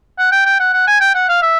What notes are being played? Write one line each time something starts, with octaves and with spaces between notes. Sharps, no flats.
F#5
G5
G5
F#5
F#5
G#5
G5
F#5
F5
E5